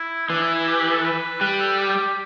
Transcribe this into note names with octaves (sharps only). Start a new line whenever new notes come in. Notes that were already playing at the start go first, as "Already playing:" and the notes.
Already playing: E4
E3 D4
E4
E4
G4
G4
A4
B4
G3 B4
A4
G4